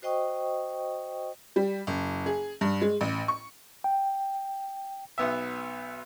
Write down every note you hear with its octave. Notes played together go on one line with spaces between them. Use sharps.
F#4 C5 D#5 G5 C#6 D#6
G3
F#1
G#4
G2
G#3
A1
C#6
G5
B1 B3 E5